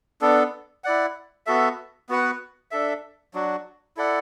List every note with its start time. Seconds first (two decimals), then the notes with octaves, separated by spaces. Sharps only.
0.21 B3 D4 A4
0.84 E4 D5 F#5
1.46 B3 F#4 A4 E5
2.09 B3 F#4 B4 F#5
2.71 D4 A4 E5
3.34 F#3 D4 F#4
3.97 E4 A4 D5 F#5